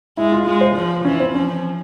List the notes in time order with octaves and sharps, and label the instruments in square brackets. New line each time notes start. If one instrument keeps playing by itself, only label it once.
[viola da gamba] G#3 [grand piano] E4
[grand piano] F4
[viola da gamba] G#3 [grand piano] F4
[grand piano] C5
[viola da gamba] F3 [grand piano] F4
[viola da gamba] E3 [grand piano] C#4
[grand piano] C4
[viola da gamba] F3 [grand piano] C#4